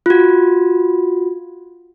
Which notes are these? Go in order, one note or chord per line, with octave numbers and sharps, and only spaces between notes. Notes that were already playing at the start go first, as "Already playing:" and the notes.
F4 F#4